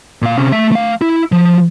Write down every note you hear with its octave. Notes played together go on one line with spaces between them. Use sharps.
A#2 F5
C3 C#4
A3 E5
A3 F5
E4
F3